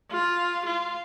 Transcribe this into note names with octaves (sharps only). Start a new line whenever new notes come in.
F4
F4